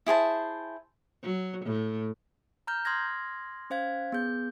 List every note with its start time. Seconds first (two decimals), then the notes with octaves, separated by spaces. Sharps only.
0.06 E4 G#4 C5 A5
1.23 F#3
1.66 A2
2.67 A#5 F6 G6
2.85 C6 D#6 F6 G#6 A#6
3.70 C#4 C5 F5 G#6
4.12 B3 G#4 G6